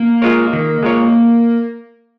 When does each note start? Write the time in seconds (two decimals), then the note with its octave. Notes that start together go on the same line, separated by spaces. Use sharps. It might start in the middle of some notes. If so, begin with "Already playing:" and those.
Already playing: A#3
0.22 G#3 F4 A#4 C#5
0.53 D#3
0.83 G#3 F4 A#4 C#5